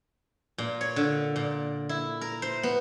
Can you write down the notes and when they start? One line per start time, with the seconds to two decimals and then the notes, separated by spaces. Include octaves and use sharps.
0.58 A#2
0.81 C#5
0.96 D3
1.36 A#2
1.89 E4
2.21 A#4
2.42 C5
2.63 B3